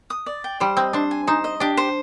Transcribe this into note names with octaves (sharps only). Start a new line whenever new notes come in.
D#6
D5
G5
G3 C5
C4 D#5
D4 C5
G#5
D#4 C5
D#5
D4 G4
C5